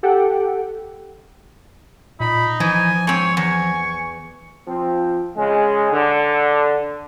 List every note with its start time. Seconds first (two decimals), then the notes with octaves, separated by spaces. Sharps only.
0.03 G4 A4 F#5 G5
2.20 A#2 D#4 B5
2.60 E3 F3 G#5
3.07 G#2 C4 C#5 G#5
3.37 E2 C#6
4.68 F3 C4
5.37 C#3 G#3
5.92 D3